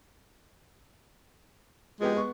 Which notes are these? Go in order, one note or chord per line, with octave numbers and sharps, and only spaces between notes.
F3 G#3 B3 G4
B3 C#6